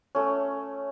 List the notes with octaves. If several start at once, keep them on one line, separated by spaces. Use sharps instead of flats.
A3 C#4